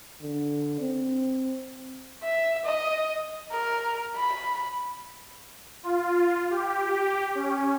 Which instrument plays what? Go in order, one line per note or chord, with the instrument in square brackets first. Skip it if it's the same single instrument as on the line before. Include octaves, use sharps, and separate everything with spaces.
[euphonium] D3
C4
[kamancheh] E5
D#5
[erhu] A#4
B5
[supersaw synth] F4
G4
C#4